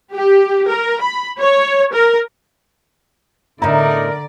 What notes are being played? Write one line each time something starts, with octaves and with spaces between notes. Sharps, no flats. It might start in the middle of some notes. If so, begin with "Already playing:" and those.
G4
A#4
B5
C#5
A#4
A2 D3 B3 D#4 E4 A#4 D5 A#5